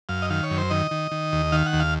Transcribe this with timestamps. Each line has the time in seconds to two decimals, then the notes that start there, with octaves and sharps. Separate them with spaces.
0.09 F#2 F5
0.22 D#5
0.30 D#3 F5
0.43 C#5
0.50 F#2
0.58 C5
0.70 D#3 D#5
0.91 D#3
1.11 D#3
1.32 D#2
1.52 D#3 F5
1.66 F#5
1.73 D#2
1.80 F5